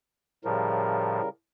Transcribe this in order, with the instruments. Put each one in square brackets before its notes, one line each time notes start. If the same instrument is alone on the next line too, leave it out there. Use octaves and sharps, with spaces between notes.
[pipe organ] A2 F3 [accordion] C#3 G3 A#4